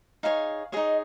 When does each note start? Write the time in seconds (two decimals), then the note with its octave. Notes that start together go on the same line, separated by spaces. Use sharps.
0.23 D#4 G#4 C#5 F5
0.72 D#4 G#4 C#5 D#5